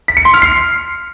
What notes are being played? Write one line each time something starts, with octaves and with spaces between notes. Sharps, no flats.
B6
C#7
C6
F6
C7